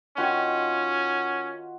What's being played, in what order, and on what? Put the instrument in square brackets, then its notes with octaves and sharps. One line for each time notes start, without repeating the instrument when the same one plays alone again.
[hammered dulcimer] D#3 F4 F#4 [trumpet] C#4